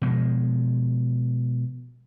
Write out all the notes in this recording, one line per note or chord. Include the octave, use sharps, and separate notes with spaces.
B2 F3 G#3